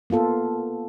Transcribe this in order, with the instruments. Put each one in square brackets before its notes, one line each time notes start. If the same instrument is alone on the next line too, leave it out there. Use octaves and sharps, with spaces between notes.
[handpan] A#3 B3 F4 A4